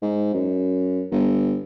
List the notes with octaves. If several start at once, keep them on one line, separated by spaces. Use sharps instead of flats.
G#2
F#2
G1